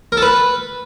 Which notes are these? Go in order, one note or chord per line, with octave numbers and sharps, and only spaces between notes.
A#4
A4
B4